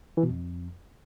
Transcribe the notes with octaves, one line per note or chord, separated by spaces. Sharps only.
E3
B2
F2